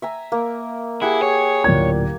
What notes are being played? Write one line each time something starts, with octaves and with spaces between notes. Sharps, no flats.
E5 G#5 A#5
A#3
E4 G4 G#4 F#5
C#5
D1 A#2 G#6